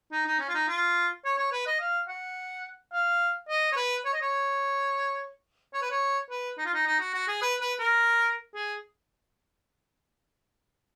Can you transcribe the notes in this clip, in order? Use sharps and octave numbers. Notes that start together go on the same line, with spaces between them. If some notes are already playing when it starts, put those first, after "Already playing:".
D#4
D#4
C#4
F4
D#4
F4
C#5
C#5
B4
D#5
F5
F#5
F5
D#5
C#5
B4
C#5
D#5
C#5
C#5
B4
C#5
B4
D#4
F4
D#4
D#4
F#4
F#4
G#4
B4
B4
A#4
G#4